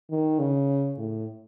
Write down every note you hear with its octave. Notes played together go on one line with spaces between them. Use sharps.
D#3
C#3
A2